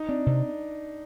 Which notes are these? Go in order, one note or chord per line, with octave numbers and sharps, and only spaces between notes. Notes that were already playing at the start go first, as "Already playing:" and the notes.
Already playing: D#4
C4 D4
C3